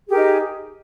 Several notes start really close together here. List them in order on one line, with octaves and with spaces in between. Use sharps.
G#4 G4 A#4 D#4